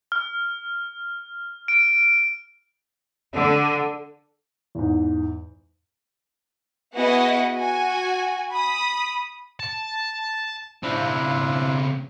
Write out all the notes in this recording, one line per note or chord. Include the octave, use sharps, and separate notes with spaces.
F6
D7
D3
E2 G#2
B3 E4 F#4 G#4 D#5 F#5
F#4 G#5
B5 D#6
A5
C#3 C4 D4 E4 F4